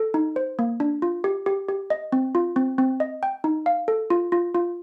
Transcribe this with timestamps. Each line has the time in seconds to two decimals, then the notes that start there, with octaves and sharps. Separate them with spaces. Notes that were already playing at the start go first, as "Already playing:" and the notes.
Already playing: A4
0.14 D#4
0.36 C5
0.59 A#3
0.80 D4
1.02 F4
1.24 G4
1.46 G4
1.69 G4
1.90 D#5
2.12 C4
2.35 F4
2.56 C4
2.78 C4
3.00 D#5
3.23 G5
3.44 D#4
3.66 F5
3.88 A4
4.10 F4
4.32 F4
4.55 F4